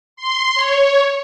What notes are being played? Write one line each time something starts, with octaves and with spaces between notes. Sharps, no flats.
C6
C#5